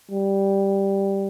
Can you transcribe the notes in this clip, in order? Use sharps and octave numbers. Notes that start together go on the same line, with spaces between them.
G3